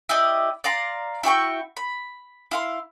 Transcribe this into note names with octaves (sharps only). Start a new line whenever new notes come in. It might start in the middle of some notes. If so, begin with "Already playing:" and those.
E4 G4 D5 D#5
D5 F5 A#5 C6
E4 F#4 G5 C#6
B5
E4 F5 C6